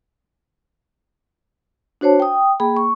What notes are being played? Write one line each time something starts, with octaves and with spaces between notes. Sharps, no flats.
D4 F#4 C5 C#5 A5
G5 D#6
A#3 G#4 G5 B5
C#6